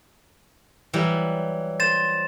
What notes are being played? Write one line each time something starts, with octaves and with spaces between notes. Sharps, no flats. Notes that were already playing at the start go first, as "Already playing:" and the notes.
E3 F#3 G3
C5 A6 E7